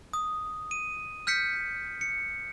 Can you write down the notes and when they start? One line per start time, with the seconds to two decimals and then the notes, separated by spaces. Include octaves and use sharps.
0.13 D#6
0.71 D#7
1.27 F6 G6 B6 C#7
2.01 C#7